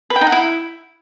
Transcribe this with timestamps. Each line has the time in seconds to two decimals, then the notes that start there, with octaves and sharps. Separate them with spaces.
0.10 B4
0.16 G5
0.21 D#4
0.27 F#5
0.32 E4